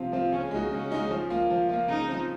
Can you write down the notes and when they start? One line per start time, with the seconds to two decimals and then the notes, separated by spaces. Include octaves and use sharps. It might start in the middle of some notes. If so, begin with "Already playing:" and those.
Already playing: C3 F3 C4 F4
0.12 F3 C4 F4
0.32 C#3 C#4
0.51 G#3 D#4 F#4
0.71 C#3 C#4
0.90 G#3 D#4 F#4
1.11 F3
1.30 A#3 F4
1.50 F3
1.69 A#3 F4
1.89 C#3 D#4
2.08 F3 C4